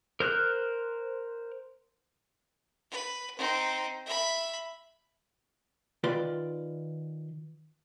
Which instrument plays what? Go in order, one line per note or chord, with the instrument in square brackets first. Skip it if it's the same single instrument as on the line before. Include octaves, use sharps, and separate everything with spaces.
[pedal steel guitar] A#4 C5 F6 F#6
[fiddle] B4
C4 D#4
E5 B5
[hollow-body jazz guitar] D#3 F4 B4 D5 C6